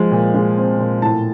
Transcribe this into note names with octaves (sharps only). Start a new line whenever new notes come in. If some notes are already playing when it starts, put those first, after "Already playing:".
Already playing: F3 G#3
A#2
G#3
C4
A#2
A2 A5